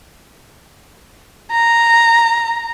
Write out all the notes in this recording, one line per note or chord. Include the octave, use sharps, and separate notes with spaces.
A#5